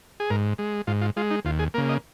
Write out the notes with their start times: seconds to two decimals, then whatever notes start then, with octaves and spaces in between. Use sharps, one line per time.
0.20 G#4
0.30 G#2 A#4
0.58 G#3
0.87 G#2 F4
1.01 F4
1.17 G#3 F4
1.31 D#4
1.45 D#2 F4
1.59 G#4
1.74 A#3 A#4
1.78 C#3
1.89 D#5